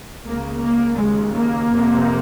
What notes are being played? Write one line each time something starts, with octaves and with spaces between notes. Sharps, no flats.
C#2 C#3 A#3
A#3
D#2 C#3 G#3
A#3
F2 C3